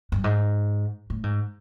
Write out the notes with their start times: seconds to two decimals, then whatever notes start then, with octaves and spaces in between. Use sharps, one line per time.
0.12 G2
0.24 G#2
1.10 A2
1.23 G#2